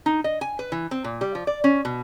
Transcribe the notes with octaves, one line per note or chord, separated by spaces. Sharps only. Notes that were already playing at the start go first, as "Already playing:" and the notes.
D#4
D#5
G#5
B4
E3
C4
A#2
G3
F3
D5
C#4
B2